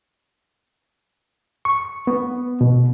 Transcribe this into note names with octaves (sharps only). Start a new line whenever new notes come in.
C#6
B3
B2